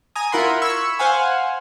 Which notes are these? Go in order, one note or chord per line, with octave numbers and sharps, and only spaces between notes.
G#5 A#5 D#6
E4 F4 A#4 F#5 B5 C6
B5 C#6 E6 G#6
C5 F5 F#5 G#5